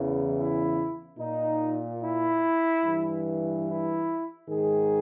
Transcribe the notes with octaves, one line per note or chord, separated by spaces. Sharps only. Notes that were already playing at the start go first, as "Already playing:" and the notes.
Already playing: E2 C#3 E3
E4
A#2 D#4
E4
G2 E3
E4
G#2 D#3 G#4